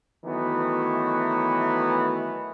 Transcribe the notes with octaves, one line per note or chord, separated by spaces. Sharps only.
D#3 E3 F#3 A3 B3